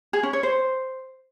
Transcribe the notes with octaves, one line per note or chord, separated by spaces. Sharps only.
G#4
C#4
C#5
C5